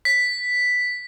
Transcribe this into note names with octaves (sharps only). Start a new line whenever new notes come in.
B6